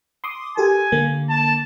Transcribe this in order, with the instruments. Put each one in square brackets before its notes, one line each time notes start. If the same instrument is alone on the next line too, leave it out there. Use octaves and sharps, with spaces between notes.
[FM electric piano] C6 D6 D#6
[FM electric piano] G4 A4 A#4 [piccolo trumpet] G#5
[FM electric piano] D3 A#3
[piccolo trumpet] A5